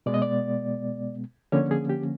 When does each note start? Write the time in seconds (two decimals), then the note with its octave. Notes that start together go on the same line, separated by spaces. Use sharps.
0.06 B2 G#3 B3 D5
0.14 D#5
0.22 D5
1.52 D3 F3 A#3 C#4 C#5
1.71 G#4
1.89 G4